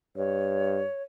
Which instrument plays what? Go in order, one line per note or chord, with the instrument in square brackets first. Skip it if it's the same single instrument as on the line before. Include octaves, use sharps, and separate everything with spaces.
[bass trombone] G2 [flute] C#5